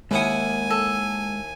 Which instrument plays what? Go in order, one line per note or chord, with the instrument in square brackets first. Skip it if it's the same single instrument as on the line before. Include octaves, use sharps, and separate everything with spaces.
[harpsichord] D#2 E4 D#6 [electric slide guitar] G#3 F#5 [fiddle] G#5
[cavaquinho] A4